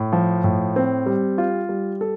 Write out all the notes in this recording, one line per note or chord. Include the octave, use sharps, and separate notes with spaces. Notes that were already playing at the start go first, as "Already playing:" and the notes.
Already playing: A2
F3
A2
C4
G3
F4
G3
A4